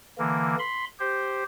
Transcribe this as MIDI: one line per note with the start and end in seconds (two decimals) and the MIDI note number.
0.18 0.56 50
0.18 0.56 52
0.18 0.56 58
0.59 0.85 83
0.59 0.85 84
0.99 1.43 67
0.99 1.43 72